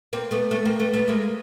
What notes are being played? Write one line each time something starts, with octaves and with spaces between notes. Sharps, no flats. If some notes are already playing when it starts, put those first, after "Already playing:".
A#3 C4
A3 B3
A3 B3
A#3 C4
A3 B3
A3 B3
G#3 A#3